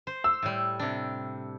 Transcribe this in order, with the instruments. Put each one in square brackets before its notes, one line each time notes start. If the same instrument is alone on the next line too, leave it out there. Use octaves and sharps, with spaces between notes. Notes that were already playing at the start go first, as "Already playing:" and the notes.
[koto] C5
[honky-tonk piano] E6
[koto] A2 G3
C3 D4